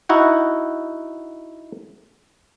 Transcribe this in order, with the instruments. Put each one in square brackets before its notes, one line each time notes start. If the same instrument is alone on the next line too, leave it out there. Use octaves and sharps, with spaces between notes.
[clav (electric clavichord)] D#4 E4 F#4 F#5